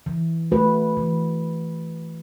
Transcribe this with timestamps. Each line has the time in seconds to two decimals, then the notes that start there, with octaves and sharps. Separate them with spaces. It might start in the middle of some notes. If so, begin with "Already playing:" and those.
0.06 E3
0.52 A3 F#4 B4
0.97 E3